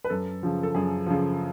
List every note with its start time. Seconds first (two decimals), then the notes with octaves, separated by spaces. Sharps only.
0.04 B4
0.10 F#2 A4
0.43 C#3 F3
0.63 A4
0.75 F#2 G#4
1.06 C#3 F3